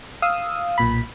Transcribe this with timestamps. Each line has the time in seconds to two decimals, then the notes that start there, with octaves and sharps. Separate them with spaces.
0.22 F5 D#6 E6
0.78 B1 A#2 B5